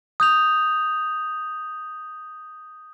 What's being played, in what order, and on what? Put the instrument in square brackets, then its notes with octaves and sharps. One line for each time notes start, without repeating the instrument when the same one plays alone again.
[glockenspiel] D#6 G6 F7